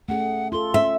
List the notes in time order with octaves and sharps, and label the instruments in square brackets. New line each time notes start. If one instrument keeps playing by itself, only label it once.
[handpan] A3 C#4 G#4 [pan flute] F#5
[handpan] F4 A4 [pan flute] C6
[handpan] C#4 [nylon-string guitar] E5